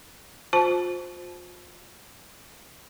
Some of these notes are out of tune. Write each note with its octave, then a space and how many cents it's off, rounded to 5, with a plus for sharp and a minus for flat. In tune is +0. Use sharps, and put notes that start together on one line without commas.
F4 +35 C5 +0 A5 -25